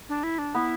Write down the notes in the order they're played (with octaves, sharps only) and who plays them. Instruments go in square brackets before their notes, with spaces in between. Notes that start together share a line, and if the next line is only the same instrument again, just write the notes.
[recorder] D4
E4
D4
[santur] B3 [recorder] E4